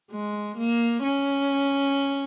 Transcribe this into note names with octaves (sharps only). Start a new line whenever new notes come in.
G#3
A#3
C#4